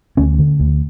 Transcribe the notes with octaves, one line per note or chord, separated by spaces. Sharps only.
D2 C#4
D3
D2